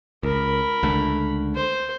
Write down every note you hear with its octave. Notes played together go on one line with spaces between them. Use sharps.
C#2 A#4 B5
C#2 D3 A3
C5